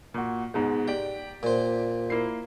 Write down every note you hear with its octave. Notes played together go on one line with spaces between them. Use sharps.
A#2 F#4
G#2 B2 G#3
G4 D5 G5
A#2 C5
A#3 E4 C7